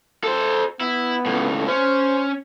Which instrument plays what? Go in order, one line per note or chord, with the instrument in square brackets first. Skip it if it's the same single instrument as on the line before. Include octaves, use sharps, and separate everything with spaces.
[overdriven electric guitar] A4 C5
[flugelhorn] B3 [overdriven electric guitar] E4
[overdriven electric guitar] C#2 A2
[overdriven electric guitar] C#4 [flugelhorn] C5